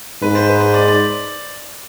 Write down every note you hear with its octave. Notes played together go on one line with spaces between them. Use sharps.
G#2 B4
C5
B4
C5
D5
D5